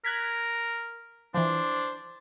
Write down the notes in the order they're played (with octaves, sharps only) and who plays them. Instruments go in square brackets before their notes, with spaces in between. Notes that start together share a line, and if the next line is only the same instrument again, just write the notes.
[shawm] A#4 [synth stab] F#6 G#6 B6
[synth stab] E3 F3 [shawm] D4 [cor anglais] C5